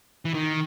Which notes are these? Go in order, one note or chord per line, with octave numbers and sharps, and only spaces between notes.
E3
D#3